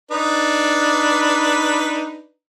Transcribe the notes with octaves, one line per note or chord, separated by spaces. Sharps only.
D4 D#4 B4